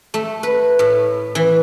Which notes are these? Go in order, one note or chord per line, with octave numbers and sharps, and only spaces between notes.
A3
B4
A2
E3